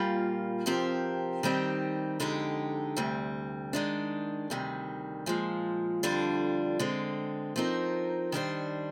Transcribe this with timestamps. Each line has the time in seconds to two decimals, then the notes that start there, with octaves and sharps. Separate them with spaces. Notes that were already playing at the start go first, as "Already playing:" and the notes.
Already playing: A#2 G3 A#3 F4
0.66 C3 F3 C4 G4 A#4
1.43 D#3 G3 C4 D#4 G4
2.20 F2 D3 G#3 D#4 G4
2.97 D2 C3 G3
3.73 D#3 G#3 D4
4.50 D2 C3 D#3 G3
5.26 A#2 F3 G#3
6.03 F2 D3 G3 D4 F4
6.79 D3 G#3 C4
7.56 F3 C4 D#4 A#4
8.32 D#3 G3 D4 G4 C5